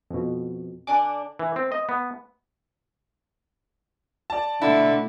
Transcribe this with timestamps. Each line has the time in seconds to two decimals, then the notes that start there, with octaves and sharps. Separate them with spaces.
0.10 F2 B2
0.87 D3 D4 G#5 D6
1.39 E3
1.56 C4
1.72 D#5
1.89 B3
4.30 D5 A5
4.62 B2 D3 A3 E4